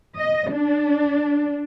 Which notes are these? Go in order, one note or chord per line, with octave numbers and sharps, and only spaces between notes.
D#5
D4